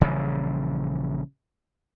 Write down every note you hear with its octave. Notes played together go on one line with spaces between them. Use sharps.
A#1 C#3 E3 G3